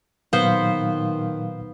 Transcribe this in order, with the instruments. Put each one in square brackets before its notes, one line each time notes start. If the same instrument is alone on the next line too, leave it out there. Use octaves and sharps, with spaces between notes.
[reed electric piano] A#2 F#3 F5 [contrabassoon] D#3 [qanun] B3 C5